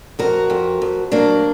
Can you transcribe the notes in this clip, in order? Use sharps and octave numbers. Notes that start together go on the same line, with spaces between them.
F2 F#4 A#4
F2
F2
F#3 A#3 D4